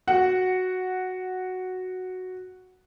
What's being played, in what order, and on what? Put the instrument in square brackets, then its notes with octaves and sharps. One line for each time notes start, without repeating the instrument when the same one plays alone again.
[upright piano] F#4 F#5